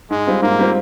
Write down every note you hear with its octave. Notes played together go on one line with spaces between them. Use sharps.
G#2 G#3
G3 C4 F4
G#2 A#3
G3 C4 F4